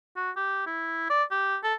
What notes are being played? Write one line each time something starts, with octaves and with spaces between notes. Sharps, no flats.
F#4
G4
E4
D5
G4
A4